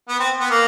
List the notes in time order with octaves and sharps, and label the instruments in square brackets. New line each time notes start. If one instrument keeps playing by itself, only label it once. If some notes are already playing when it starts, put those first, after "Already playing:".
[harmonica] B3
C4
B3
A#3